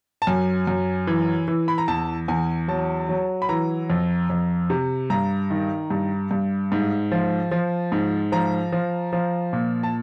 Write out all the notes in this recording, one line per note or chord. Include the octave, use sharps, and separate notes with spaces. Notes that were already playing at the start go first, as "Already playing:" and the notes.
A5
F#2 G#5
F#2
E3
E3
B5
A#5
E2 A5
E2 G#5
F#3 A5
F#3
B5
E3 A#5
F2
F2
C3
G2 A#5
D#3
G2
G2
G#2
F3
F3
G#2
F3 A#5
F3
F3
A#2
A5